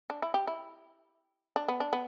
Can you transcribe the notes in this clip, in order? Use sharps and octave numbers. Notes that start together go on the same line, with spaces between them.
D4
E4
G4
E4
D4
B3
D4
B3